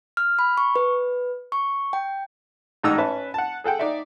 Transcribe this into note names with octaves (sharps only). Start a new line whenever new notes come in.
F6
B5
C#6
B4
C#6
G5
A1 G#2 D#4 A#5 E6
C#4 B4 E5 A5
F#5 A5
G#4 A4 F#5 G5
D#4 D5 E5